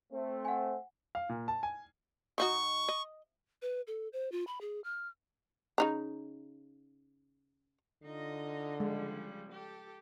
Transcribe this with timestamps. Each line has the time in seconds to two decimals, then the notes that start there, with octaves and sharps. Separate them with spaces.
0.13 A3 C4 C5
0.45 F#5 G#5
1.15 F5
1.29 A#2
1.48 A5
1.63 G#5
2.38 D#3 D#4 F#4 C#6
2.89 D#5
3.62 B4
3.87 A4
4.13 C5
4.32 F4
4.47 B5
4.61 G#4
4.84 F6
5.78 C#3 D#4 A#5
8.03 D3 D#4 F4 D#5
8.80 C#3 F3 G3 G#3
9.51 G4 A4